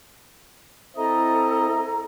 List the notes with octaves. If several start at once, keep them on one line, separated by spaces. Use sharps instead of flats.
C4 E4 A4 D#5 A#5